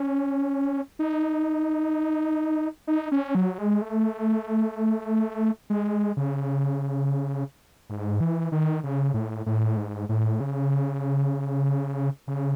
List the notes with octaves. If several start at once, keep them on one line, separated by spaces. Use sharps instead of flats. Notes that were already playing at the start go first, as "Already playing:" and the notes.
Already playing: C#4
D#4
D#4
C#4
F#3
G#3
A3
G#3
C#3
G#2
E3
D#3
C#3
A2
A2
G#2
A2
C#3
C#3